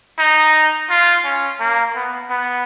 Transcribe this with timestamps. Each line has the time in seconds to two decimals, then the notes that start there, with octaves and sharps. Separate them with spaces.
0.19 D#4
0.90 F4
1.24 C#4
1.60 A#3
1.95 B3
2.30 B3